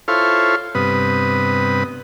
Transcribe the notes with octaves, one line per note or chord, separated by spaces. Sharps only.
E4 F4 A4 C5 C#5 F5
G2 C3 B3 B4 D#6